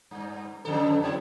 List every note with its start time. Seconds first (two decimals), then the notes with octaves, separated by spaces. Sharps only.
0.11 G2
0.65 F2 D3 A4
1.02 F#3 C4 E4